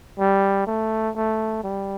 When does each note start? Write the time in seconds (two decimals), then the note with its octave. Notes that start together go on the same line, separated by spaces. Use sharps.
0.19 G3
0.67 A3
1.15 A3
1.64 G3